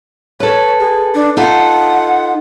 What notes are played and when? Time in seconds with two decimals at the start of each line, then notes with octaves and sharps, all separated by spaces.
0.40 A4 B4 C#5
0.80 G#4
1.15 D4
1.37 D#4 F4 A4 F#5